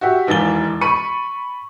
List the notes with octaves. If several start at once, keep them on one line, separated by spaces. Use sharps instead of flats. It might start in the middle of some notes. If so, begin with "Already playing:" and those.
F#4 G4 E5
E1 D#2 E3 A6 G7
B5 C#6 C#7 D#7